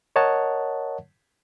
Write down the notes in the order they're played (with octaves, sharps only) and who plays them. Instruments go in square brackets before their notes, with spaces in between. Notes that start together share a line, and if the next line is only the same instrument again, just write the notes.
[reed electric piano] A#4 C#5 D#5 F#5 A5